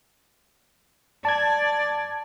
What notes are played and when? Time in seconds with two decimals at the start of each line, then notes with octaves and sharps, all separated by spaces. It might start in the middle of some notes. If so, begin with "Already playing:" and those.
1.25 D5 A5 G#6